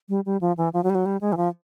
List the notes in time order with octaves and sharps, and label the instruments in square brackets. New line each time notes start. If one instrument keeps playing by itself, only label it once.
[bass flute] G3
G3
F3
E3
F3
F#3
G3
F#3
G3
G#3
E3
F3